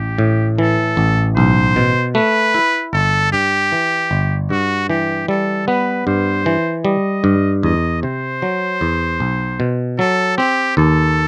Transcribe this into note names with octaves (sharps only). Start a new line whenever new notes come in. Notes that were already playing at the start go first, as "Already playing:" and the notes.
Already playing: A1 G4
A2
E3 A4
A1
B1 C5
B2
A3 B4
E4
G1 A4
G2 G4
E3
G1
G2 F#4
E3 G4
G3 A4
B3 B4
G2 C5
E3
G3 D#5
G2
E2 D#5
C3 C5
F#3
E2
B1
B2
F#3 A4
C4 G4
D#2 A4